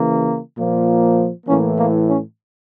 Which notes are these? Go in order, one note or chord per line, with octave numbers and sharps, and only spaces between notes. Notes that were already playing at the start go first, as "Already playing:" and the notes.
Already playing: C#3 E3 A#3
A#2 F3 A#3
A2 E3 A#3 C#4
A#3
C#4